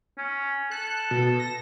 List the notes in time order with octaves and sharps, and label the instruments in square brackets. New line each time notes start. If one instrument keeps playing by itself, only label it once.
[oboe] C#4
[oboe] A4 [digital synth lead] F#6
[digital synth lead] B2
A#6